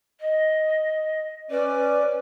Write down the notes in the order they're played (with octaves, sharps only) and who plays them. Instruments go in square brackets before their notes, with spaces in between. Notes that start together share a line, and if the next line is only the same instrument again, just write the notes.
[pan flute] D#5
[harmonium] C#4 D5 [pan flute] B4